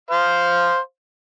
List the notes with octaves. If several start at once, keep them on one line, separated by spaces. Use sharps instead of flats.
C5 F5